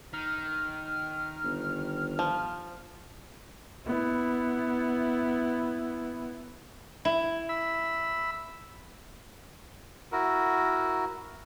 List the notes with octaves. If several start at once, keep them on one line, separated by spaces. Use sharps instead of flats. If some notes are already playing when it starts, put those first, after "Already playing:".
D#3 F6
G1
F3
B3 E4
E4
B5 E6
E4 F#4 A#4